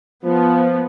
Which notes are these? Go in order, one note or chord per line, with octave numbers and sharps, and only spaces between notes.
F3 B3